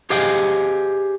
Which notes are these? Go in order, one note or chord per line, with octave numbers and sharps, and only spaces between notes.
G4 G#4 C5 D#5 F5 G5